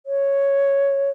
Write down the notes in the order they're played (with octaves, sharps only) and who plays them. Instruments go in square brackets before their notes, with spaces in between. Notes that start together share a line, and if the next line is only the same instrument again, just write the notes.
[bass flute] C#5